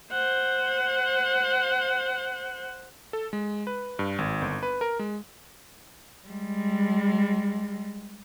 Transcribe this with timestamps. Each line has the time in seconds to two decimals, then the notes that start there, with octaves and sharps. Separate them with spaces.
0.12 C5 F#5
3.13 A4
3.33 G#3
3.67 B4
3.99 G2
4.18 G#1
4.42 G1
4.63 B4
4.81 A#4
4.99 G#3
6.29 G3 G#3